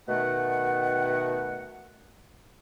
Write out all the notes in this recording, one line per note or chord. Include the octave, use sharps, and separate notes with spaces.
B2 D#3 A3 F#5